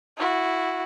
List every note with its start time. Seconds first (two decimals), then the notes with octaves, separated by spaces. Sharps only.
0.17 E4 F#4